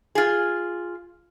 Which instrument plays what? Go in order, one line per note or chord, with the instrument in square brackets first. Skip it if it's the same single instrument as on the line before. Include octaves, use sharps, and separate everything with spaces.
[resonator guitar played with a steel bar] F4 G#4